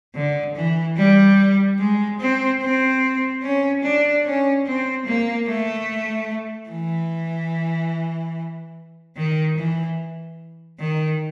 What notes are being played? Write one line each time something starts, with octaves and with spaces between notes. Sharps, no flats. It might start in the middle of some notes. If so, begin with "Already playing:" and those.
D3
E3
G3
G#3
C4
C4
C#4
D4
C#4
C4
A#3
A3
E3
D#3
E3
D#3